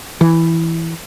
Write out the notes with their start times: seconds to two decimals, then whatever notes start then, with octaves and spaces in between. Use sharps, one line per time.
0.21 E3